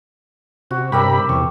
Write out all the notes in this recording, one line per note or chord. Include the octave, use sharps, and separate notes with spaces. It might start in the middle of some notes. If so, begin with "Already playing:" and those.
C3 F#4
G2 C3 G4 A#4 E5 B5
E2 C3 C#6